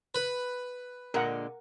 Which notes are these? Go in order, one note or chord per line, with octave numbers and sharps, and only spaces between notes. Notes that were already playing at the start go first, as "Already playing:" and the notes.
B4
A#2 D3 G#3 A#4 F#5